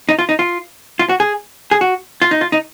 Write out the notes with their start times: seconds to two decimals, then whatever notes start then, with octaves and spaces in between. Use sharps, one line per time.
0.09 D#4
0.19 F4
0.29 D#4
0.39 F4
0.99 F4
1.09 F#4
1.20 G#4
1.71 G#4
1.81 F#4
2.22 F4
2.31 D#4
2.41 F4
2.52 D#4